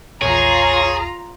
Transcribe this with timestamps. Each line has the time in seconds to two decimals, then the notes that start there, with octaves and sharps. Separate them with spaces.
0.22 A#1 E2 F4 G#4 C#5 A#5